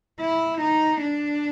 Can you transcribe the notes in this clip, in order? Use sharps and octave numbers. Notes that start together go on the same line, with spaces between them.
E4
D#4
D4